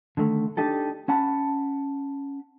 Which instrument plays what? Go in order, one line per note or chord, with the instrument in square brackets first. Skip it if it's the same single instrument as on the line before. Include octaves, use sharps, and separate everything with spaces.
[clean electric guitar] D3 D#3 A3
D4 D#4 G4 A4
C#4 F#5 A5 B5